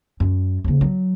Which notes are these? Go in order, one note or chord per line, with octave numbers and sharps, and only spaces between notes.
F#2
D#2 C#3
F#3